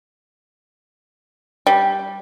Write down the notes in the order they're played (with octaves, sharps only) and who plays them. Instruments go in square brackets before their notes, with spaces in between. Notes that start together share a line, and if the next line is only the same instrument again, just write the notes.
[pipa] G3